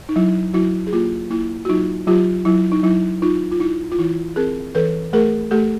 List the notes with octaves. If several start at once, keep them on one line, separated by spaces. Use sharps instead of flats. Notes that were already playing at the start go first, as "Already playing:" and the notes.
D#4
F#3 E4
F#3 E4 F#4
G#4
A#3 F4 G4
A#3 E4
F#4
F#3 D#4 F4
F#3 F4 G4
F#3 E4
D#4
F#3 E4
D#4 F4
F4
D#4 E4
F4
E3 E4
C4 G#4 A#4
E3 A4 B4
A3 G#4 A#4
A3 G4 A4